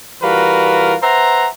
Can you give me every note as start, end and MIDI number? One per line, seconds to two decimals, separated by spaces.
0.22 0.96 52
0.22 0.96 55
0.22 0.96 65
0.22 0.96 66
0.22 0.96 70
0.22 0.96 71
1.02 1.48 71
1.02 1.48 72
1.02 1.48 76
1.02 1.48 78
1.02 1.48 82